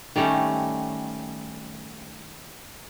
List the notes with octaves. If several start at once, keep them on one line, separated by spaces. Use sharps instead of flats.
D#3 G3 A3 C#4